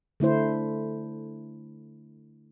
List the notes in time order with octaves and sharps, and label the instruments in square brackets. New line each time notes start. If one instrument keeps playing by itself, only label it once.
[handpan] D3 A3 E4 C5